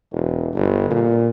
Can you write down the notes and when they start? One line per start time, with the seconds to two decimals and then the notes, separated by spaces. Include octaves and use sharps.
0.12 E1
0.54 G1
0.90 A#2